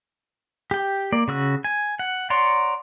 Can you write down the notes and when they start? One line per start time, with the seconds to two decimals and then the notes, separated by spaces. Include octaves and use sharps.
0.71 G4 G5
1.12 A#3 D5
1.28 C#3 F#4 E6
1.64 G#5
1.99 F#5
2.30 C#5 D5 F#5 A#5 C6